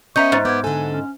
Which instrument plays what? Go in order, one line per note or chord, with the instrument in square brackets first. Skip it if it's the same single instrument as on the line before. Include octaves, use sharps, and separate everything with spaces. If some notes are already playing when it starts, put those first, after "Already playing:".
[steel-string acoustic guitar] B3 C#4 D#5 [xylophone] E5 A#5 G6 [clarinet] C#6
[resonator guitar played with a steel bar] G#2 [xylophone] C5 A6
[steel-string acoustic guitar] B3 [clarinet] D6 [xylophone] G6 G#6
[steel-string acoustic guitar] D3 A4 [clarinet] G#5
[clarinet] C#4